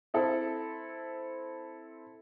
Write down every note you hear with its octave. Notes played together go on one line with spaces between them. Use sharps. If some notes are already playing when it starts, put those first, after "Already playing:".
C4 E4 A4